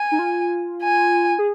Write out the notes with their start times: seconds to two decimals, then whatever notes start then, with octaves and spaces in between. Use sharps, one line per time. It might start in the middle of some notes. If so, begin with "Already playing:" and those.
Already playing: G#5
0.12 D#4
0.19 F4
0.83 G#5
1.39 G#4